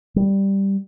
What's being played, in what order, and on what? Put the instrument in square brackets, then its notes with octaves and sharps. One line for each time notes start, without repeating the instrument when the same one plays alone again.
[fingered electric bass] G3